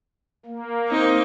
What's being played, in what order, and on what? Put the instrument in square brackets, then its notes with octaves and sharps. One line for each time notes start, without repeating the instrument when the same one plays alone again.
[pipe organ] A#3
[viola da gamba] C4 D#4